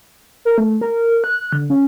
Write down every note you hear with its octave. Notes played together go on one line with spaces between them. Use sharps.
A#4
A3
A#4
F#6
D3
C#4